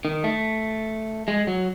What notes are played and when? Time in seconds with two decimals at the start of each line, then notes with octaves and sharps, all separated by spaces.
0.05 D#3
0.24 A3
1.28 G#3
1.47 F#3